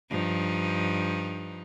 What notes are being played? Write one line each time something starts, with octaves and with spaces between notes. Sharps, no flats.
G2 F3 D#4